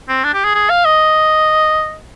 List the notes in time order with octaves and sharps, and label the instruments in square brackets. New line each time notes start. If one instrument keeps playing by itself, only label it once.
[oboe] C4
D4
G4
G#4
G#4
F5
D#5